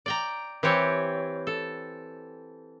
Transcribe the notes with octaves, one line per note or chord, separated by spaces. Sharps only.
D5 G5 A#5
E3 C4 G4 C#5
A4